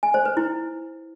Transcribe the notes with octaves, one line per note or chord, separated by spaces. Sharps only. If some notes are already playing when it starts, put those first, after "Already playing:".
G#5
C5
B4
E4